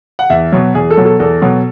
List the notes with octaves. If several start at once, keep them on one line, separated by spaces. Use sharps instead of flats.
F#5
E2 E5
B2 F#3
E2 G#4
A4
B2 F#3
A4
E2 A4
B2 F#3